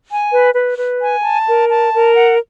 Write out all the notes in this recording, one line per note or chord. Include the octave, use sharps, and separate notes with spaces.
G#5
B4
B4
B4
G#5
A5
A#4
A5
A#4
F#5